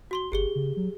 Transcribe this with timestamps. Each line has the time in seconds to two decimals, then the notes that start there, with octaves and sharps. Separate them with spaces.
0.11 F#4 C6 G7
0.32 G1 G4 G#4 G7
0.55 C#3
0.77 F#3